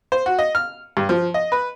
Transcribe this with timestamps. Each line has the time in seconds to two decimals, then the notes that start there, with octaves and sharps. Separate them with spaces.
0.12 C5
0.26 F#4
0.39 D#5
0.55 F6
0.97 G2
1.09 F3
1.34 D#5
1.52 B4